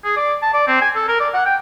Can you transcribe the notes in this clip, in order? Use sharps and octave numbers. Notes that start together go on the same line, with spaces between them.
G#4
D5
A5
D5
C4
G#5
A4
A#4
D5
F#5
G5